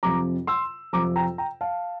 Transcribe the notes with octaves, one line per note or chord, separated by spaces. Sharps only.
F2 C3 F3 A#5 D6
C6 E6
F2 C3 F3 A#5 D6
G5 A#5
G5 A#5
F5 A5